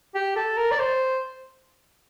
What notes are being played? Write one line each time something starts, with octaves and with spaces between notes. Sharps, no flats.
G4
A4
A#4
D5
C5